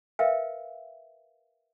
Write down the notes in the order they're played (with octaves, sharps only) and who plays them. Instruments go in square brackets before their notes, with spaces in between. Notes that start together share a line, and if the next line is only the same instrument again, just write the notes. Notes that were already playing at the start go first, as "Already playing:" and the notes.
[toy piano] A#4 B4 E5 F5 G5